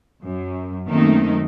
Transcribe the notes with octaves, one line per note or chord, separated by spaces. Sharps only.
F#2
F#2 D#3 A3 A#3 C4 D#4